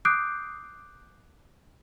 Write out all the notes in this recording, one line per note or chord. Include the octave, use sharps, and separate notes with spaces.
D6 D#6 F#6 G6 C7 D7